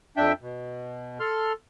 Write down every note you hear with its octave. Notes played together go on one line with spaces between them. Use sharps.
F2 D4 E5 G5
B2
A4 C6 F6